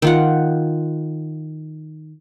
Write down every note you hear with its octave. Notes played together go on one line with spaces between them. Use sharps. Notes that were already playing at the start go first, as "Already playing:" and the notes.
D#3 F4 F#5